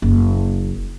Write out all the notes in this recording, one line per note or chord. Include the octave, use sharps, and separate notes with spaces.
F#1